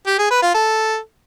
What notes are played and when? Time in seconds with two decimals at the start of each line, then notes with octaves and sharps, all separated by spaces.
0.07 G4
0.19 G#4
0.30 B4
0.42 F4
0.54 A4